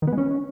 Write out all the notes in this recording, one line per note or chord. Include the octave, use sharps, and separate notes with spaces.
D#3
B3
G#3
C#4